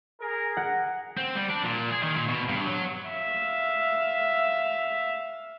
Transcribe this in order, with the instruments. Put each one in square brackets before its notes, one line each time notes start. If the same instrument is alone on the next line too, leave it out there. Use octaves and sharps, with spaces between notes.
[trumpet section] G#4 A#4
[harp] F#5
[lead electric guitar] C4
G3
D4
A#2
G#4
D#3
A#2
B2
G2
F#3
[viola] E5 F5